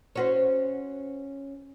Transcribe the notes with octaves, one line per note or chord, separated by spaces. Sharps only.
C#4 F#4 C5